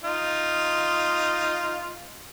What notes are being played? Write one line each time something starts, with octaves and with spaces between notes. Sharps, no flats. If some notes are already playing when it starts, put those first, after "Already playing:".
D#4 F4